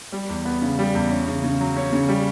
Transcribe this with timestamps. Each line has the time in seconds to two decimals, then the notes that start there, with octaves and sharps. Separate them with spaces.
0.12 G3
0.29 E2
0.45 B3
0.62 C#3
0.79 G3
0.95 E2
1.10 C#4
1.28 C#3
1.44 C#3
1.60 F#3
1.77 C#4
1.93 C#3
2.09 G3